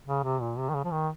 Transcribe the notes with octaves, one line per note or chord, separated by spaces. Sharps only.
C#3
C3
A#2
C3
D#3
C#3
F3
D#3